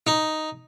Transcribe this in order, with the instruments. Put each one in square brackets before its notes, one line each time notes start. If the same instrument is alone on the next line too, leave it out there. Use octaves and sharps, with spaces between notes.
[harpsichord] D#4